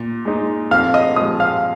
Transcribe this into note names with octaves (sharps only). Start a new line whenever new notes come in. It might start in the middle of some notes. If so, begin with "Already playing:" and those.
Already playing: A#2
G#3 D#4
F2 F5 F6
D#5 D#6
F3 G#3 D#5 D#6
F5 F6